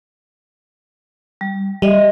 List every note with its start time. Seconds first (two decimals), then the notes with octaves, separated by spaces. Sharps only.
1.41 G3
1.82 G3 D#5 E5